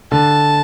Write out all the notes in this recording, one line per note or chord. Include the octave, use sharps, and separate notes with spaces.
D3 A5